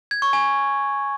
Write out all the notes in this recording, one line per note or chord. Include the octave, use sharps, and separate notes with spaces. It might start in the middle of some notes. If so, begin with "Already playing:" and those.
G#6
C#6
G#5